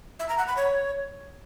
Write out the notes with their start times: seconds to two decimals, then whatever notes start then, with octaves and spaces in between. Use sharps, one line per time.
0.19 E5
0.29 A#5
0.38 F#5
0.47 B5
0.57 C#5